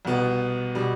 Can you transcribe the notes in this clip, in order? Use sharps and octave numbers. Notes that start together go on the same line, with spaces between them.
C2 B2 B3
B2 G3